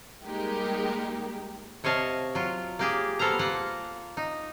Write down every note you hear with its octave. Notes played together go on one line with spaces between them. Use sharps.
G3 G#3 A#3 D#4 G4 A#4
C3 C#5 D#5 F5 A5
F#3 F4
A#3 G4 G#4
G3 B3 A4 C5 F5 A#5
A#3 F4 F#5
D#4